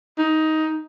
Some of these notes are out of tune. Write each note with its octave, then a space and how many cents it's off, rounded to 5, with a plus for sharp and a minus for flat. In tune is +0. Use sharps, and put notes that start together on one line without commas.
D#4 +15